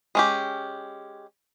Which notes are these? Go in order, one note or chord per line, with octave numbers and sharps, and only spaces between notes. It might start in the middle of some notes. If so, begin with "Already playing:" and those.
G#3 C#4 G4